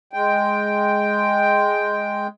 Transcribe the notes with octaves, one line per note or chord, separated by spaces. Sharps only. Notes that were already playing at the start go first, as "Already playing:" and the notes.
G#3 G5